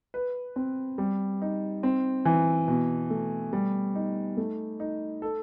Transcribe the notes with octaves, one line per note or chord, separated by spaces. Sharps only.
B4
C4
G3
D#4
C4
E3
B2
A3
G3
D#4
A3
D#4
A4